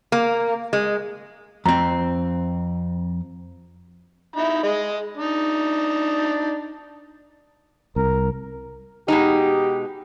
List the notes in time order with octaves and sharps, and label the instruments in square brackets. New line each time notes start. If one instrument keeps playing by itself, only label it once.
[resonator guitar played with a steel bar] A#3
G#3
[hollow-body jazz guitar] F2 C4 [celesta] A#5
[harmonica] D#4 E4 B5
G#3 D#5
D4 D#4
[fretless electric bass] C2 [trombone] A#4
[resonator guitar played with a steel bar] B2 G#3 D#4 [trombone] G4